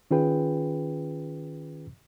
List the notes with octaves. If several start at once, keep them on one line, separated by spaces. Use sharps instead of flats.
D#3 C#4 F4 G#4 B4 G5